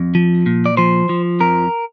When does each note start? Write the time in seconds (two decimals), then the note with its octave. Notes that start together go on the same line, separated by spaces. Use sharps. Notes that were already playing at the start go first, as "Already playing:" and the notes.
Already playing: F2
0.15 F3
0.46 A#2
0.66 D5
0.77 F3 C5
1.09 F3
1.40 F2 A#4